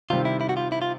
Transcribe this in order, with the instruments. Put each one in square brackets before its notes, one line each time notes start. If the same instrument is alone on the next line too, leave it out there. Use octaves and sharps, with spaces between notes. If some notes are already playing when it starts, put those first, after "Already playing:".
[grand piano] C3 D#3 G3 C4 [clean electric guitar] F4
[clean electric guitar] E4
E4
F#4
F4
E4
F4